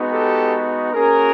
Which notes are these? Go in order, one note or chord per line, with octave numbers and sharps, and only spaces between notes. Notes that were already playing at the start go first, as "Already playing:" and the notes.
Already playing: G#3 B3 D#4 F#4
G4 A4
A#3 C#4 F#4 G#4 A#4